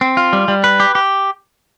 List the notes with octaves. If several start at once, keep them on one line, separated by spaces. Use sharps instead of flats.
C4
F4
G3
G3
B4
G4
G4